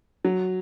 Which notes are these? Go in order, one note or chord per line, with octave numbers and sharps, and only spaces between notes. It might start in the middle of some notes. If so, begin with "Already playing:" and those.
F#3